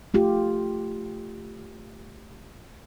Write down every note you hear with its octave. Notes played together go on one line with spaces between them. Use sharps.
A3 F4 G4